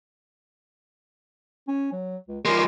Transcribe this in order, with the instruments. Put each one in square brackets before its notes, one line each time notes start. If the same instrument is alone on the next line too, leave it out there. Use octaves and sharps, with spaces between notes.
[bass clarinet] C#4
F#3
C#2
[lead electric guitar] F3 G#3 [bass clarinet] A#4